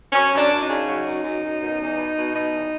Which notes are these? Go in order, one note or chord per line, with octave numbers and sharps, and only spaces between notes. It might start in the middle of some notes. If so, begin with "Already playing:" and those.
F#2 C#4
F#2
D4
F#2
D#4
C#3
F#3
F#2
F#2
F#2
B2
E2
B2
B2
B2 D#4
E2